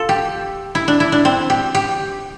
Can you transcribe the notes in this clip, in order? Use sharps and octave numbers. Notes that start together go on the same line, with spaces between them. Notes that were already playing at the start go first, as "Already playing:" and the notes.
Already playing: F4 A4
G4
E4
D4
E4
D4
C4
G4
G4